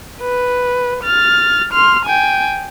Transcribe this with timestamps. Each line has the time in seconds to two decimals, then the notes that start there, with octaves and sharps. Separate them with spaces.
0.21 B4
1.03 F6 A6
1.72 C6 F6
2.06 G5 G#5